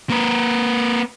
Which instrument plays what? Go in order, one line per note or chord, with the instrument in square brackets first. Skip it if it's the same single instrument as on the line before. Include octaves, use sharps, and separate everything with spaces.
[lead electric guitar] A#3 B4